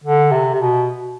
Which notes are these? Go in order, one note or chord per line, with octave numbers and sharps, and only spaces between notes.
D3
C3
C3
B2